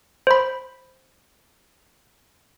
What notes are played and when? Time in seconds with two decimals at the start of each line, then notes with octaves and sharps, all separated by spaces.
0.27 C5 B5